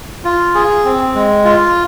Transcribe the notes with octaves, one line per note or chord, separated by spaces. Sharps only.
F4
G#4
C4
G#3
F4